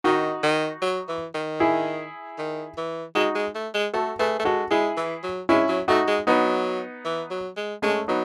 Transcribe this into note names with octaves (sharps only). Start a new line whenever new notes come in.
D#3 D#4 F#4
D#3
F#3
E3
D#3
E4 G#4
D#3
E3
G#3 D#4 F#4
G#3
A3
G#3
A3 F#4 A4
A3 G#4 B4
A3
G#3 F#4 A4
G#3 E4 G#4
E3
F#3
G#3 C#4 E4
F#3
A3 D#4 F#4
G#3
F#3 B3 D#4
E3
F#3
G#3
G#3 A3 C#4
F#3 B3 D#4